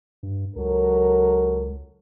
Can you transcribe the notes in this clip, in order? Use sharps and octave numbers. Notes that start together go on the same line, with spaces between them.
G2
C#2 F#3 A4 A#4